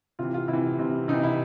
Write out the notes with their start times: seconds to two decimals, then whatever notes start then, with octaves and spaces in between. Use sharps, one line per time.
0.19 C3 E3 F4
0.34 F4
0.48 C3 E4
0.53 E3
0.79 C3 E3
1.08 C3 E3 D#4
1.23 E4